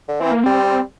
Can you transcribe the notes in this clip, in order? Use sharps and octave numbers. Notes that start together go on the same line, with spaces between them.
D3
E3 C4
A#3
G3 C4